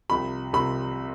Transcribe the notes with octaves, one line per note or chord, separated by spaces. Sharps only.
C2 C3 F3 B5
C2 C3 F3 B5